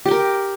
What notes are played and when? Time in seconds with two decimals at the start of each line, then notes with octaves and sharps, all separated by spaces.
0.06 G4
0.08 G5
0.11 A#4